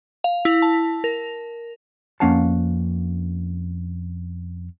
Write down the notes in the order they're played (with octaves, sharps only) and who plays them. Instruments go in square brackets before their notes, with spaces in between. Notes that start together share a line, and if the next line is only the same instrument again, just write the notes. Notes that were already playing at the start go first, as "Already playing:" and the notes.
[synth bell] F5
E4
A5
A#4
[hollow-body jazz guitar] F2 A#3 C#4 F5 F#5 A5